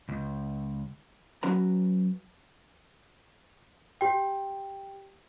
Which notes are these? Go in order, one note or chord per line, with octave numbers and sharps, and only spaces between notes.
C#2
F#3 C#4 B4 A#5
G4 G5